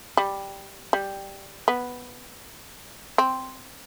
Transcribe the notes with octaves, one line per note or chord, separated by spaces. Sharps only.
G3
G3
B3
C4